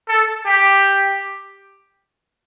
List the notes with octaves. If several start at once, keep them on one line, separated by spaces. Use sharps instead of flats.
A4
G4